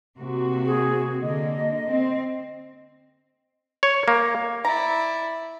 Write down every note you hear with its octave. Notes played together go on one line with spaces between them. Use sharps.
C3 A#3 F#4
G#4
D3 A#3 D#5
C4
C#5
A#3
E4 D5 A#5